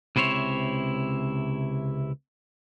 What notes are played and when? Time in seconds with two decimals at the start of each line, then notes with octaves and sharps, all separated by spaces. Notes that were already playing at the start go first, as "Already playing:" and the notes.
0.16 C#2 C3 E4 C5 C#5